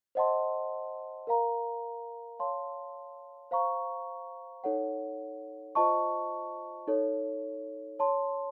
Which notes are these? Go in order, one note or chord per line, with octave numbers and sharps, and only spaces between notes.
C5 D#5 F#5 A5 C6
A#4 F5 A#5
C#5 F5 A5 C6
C5 F5 A#5 C#6
D#4 A4 C#5 F#5
F4 C5 D#5 A5 C#6
D#4 A4 C#5
C#5 A5 C6